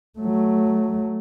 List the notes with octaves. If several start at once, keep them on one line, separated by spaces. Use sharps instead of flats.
F#3 A3